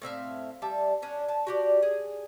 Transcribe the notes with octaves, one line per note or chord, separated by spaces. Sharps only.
A2 C4 E5 F5
G3 E5 A5
C#4 D4
A5
F#4 G4 D5
G#4